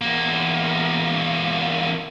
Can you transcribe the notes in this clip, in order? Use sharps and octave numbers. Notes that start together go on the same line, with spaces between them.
E2 A#3